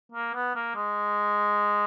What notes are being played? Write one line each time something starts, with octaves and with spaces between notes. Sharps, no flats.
A#3
B3
A#3
G#3